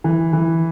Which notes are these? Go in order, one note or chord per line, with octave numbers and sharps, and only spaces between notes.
E3
E3